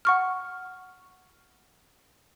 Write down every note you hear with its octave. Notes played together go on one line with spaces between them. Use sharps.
F#5 C#6 F6